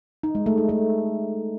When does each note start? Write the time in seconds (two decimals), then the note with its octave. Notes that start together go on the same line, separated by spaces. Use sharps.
0.23 D#4
0.35 G#3
0.46 A3
0.58 D#4
0.69 A3